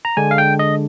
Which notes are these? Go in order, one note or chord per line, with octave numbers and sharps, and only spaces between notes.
A#5
D3 G#3 D4 G#5
F5
G5
D#5